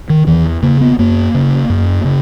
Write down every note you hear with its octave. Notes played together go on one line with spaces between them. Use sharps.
D#3
E2 E3
C#3 A#3
B3
F#2 A#3
C#3
F#2
C#3